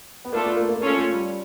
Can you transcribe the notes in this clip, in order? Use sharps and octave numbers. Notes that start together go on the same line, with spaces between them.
B3
A3 A#3 D4 F4 A4
B3
A#3
A#3
A#3 C#4 F4 A4 C#5
A3
G3